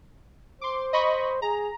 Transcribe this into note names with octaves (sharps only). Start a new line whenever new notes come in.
C5 C6 D6
D#5 B5 C#6
G#4 A#5